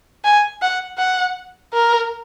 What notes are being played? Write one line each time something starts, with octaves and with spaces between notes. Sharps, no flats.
G#5
F#5
F#5
A#4